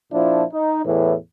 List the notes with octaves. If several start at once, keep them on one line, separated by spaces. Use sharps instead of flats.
A#2 F3 D4 E4
D#4
E2 A2 E3